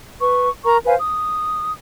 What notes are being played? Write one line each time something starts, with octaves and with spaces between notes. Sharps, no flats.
B4 C#6
A#4 A#5 C#6
B4 C5 F5 G#5
D#6